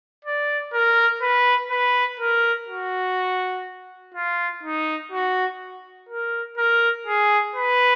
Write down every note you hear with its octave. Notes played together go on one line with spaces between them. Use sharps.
D5
A#4
B4
B4
A#4
F#4
F4
D#4
F#4
A#4
A#4
G#4
B4